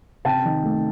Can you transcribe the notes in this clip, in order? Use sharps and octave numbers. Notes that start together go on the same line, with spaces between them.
C3 G5 A5
D#3
A3